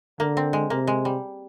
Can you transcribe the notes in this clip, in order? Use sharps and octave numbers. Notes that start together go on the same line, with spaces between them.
D3 A#3
C4
G#3
C3 A#3
G#3
G3